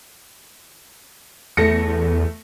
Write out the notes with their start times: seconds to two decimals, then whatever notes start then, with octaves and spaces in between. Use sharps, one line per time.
1.57 E2 A3 A#6 C#7